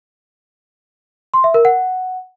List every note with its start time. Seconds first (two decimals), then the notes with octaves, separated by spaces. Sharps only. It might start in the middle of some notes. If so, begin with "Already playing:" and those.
1.34 C6
1.44 E5
1.54 A#4
1.65 F#5